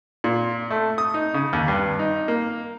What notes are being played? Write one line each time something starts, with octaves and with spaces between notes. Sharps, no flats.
A#2
A3
D#6
D#4
C#3
D#2
G2
D#4
A#3